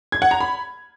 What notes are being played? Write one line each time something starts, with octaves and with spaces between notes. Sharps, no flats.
G#6
F#5
A#5
B5